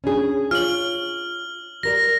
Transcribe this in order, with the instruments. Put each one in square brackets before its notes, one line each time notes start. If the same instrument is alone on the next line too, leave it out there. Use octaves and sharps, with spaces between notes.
[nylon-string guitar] C#4 D4 G#4
[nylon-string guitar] F4 C#5 [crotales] F6 F#7
[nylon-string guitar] G3 A#4 D5 [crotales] A#6